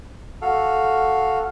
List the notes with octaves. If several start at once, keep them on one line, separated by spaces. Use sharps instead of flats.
F#4 A4 F5